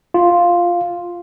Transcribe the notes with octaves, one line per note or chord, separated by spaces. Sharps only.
F4